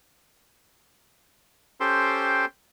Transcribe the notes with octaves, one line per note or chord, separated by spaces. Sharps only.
C#4 G4 A4 C5 G5 C6